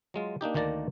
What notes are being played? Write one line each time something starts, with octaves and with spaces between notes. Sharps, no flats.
F#3 G#3 F4
A#3 D4 D#4 G4
D2 D#3 A#3 D5 A5 A#5